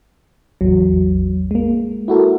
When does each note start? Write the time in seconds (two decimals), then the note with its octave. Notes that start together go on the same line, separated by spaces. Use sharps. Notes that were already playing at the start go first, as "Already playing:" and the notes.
0.61 A1 E2 F#3
1.51 G#3 A#3
2.08 E4 F#4 A4 A#4